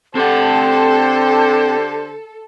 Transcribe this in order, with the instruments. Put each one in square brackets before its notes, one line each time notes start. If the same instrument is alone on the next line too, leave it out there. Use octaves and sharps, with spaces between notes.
[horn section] D3 G4 C5 [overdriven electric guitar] C4 F#5 [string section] A4 [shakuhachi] G5